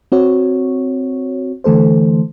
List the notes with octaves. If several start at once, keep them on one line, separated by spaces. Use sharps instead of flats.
C4 F#4 C#5
D3 E3 A3 A4 C5